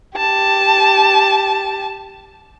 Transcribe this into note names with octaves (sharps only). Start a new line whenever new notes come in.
G4 A5